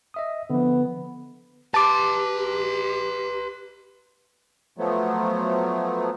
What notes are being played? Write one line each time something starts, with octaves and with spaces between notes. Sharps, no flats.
D#5 E5 D#6
D3 F3 B3
G4 B4 A5 C6 D6
F3 F#3 A3 B3